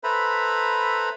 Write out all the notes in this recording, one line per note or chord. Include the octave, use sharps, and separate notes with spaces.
A4 B4 C5 E5 A#5 B5